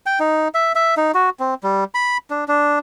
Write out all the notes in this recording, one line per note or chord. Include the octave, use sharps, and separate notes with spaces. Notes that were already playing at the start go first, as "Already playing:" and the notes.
G5
D#4
E5
E5
D#4
F#4
C4
G3
B5
D4
D4